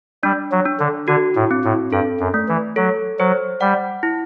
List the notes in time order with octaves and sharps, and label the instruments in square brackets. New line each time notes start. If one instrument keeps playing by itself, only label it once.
[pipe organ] G3 [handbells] D4
[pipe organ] F#3
[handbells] D4
[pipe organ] D3
[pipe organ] D3 [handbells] F#4
[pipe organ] A2
[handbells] C4
[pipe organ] A2
[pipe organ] G2 [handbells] A4
[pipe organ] F#2
[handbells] A3
[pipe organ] E3
[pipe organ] F#3 [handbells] A4
[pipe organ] F#3 [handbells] C5
[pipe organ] G3 [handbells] F#5
[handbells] E4